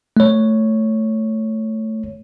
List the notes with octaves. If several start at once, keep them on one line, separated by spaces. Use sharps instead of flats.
A3 C#5